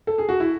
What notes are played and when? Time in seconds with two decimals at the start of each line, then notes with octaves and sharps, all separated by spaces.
0.07 A4
0.18 G#4
0.29 F#4
0.40 E4